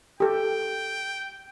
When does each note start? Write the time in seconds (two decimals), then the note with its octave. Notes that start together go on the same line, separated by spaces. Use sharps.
0.20 G4 A4 G5